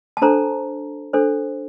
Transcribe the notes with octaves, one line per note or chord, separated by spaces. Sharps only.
A5
D4 A4 C5 A#5
D4 A4 C5